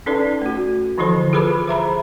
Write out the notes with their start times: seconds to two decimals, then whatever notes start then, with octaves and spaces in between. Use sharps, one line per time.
0.06 C#4 D#4 A4 B4 D5
0.42 A3 F#4
0.98 D3 E3 F3 E4 A4 C5
1.33 F4 G#4 A4 B4 B5 D6
1.67 C5 E5 A#5 B5